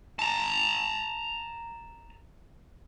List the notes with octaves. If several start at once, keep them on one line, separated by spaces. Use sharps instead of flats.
A5 A#5